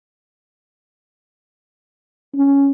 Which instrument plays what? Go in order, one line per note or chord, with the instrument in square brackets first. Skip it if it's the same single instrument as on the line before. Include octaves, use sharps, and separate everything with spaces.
[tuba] C#4